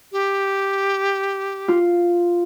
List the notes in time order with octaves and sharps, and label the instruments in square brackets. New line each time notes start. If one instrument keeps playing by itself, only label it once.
[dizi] G4
[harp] F4